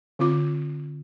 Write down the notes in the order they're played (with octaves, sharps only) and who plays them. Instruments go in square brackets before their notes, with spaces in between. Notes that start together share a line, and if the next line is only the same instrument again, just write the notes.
[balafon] D3 C4 F4 D6